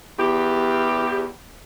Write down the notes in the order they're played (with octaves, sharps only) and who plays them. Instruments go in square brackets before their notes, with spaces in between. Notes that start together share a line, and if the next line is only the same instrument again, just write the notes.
[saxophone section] E2 G4